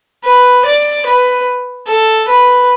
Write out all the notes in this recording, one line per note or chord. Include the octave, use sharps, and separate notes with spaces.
B4
D5
B4
A4
B4